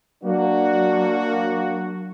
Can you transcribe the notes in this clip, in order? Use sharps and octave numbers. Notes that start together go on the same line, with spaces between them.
F#3 A#3 D4 F#4